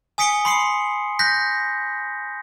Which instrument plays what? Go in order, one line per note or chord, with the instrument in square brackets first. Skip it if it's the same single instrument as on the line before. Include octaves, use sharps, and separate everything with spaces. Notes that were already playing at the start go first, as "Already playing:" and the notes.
[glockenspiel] G#5 D#6 B6 C#7 D7 G7
B5 C6 D#6 C7 C#7 F#7
F#6 G6 A#6 B6